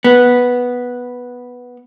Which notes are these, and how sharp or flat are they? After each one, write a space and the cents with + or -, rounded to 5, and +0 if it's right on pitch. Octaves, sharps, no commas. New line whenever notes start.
B3 -5